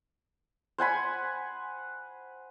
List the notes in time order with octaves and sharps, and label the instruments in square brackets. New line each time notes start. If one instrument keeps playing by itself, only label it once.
[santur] C5 F#5 G#5 B5